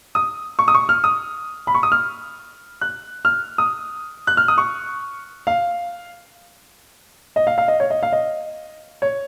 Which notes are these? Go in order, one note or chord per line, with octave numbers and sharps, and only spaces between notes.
D#6
C#6
D#6
C#6
F6
D#6
B5
C#6
D#6
F6
F#6
F6
D#6
F#6
F6
D#6
C#6
F5
D#5
F5
F5
D#5
C#5
D#5
F5
D#5
C#5